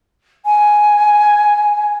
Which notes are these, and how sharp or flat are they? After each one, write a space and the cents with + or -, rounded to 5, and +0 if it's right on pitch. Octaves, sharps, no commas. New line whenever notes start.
G#5 +5